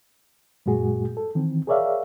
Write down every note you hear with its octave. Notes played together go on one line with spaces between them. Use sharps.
F#2 A#2 G#3 F#4 G#4
A4
D#3 E3 C4
G#4 A#4 C#5 D5 E5 F5